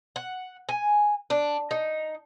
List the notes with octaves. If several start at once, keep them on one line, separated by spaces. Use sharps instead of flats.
F#5
G#5
D4
D#4